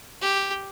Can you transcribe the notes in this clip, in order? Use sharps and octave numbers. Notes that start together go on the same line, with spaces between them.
G4